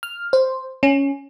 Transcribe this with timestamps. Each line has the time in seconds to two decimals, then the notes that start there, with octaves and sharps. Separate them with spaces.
0.03 F6
0.33 C5
0.83 C#4